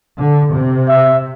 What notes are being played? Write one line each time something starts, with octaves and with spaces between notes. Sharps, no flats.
D3
C3
E5